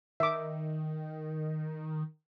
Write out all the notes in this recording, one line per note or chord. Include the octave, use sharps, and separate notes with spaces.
D#3 E5 D6